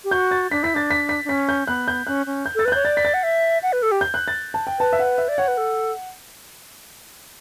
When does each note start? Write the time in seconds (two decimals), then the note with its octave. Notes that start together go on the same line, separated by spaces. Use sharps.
0.04 G4
0.11 F#4 G6
0.31 A6
0.51 D4 B6
0.63 E4 B6
0.74 D4 A6
0.91 B6
1.09 B6
1.25 D4
1.29 C#4 B6
1.49 G6
1.67 B3 F#6
1.88 G6
2.07 C#4 F#6
2.26 C#4
2.46 G6
2.55 A4
2.59 A6
2.65 B4 F#6
2.72 C#5 G6
2.85 D5 A6
2.97 B6
3.05 A6
3.14 F#5
3.23 E5
3.63 F#5
3.73 B4
3.82 A4
3.92 G4
4.01 G6
4.14 F#6
4.28 A6
4.54 A5
4.67 G5
4.79 B4 A5
4.93 E5
4.99 F#5
5.18 E5
5.28 D5
5.38 C#5 F#5
5.48 B4
5.58 A4